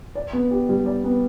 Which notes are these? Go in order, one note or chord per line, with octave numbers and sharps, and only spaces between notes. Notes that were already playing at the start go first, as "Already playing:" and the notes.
D5
B3
G4
G3
D5
B3